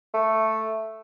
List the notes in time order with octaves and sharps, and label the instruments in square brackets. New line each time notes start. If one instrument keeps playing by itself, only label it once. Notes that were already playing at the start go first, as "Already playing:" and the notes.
[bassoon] A3